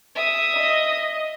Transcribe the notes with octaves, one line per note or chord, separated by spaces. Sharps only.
E5 D#6
D#5